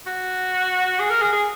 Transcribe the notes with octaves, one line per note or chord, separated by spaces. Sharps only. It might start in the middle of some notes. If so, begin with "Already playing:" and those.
F#4
G#4
A#4
G#4
G#4